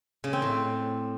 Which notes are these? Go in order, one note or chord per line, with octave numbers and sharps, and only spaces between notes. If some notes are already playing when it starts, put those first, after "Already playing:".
C#3
C4
A2